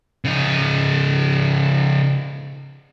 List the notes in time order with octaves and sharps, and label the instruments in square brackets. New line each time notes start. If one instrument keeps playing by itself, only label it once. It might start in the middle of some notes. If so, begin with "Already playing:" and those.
[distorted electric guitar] C#3 D#4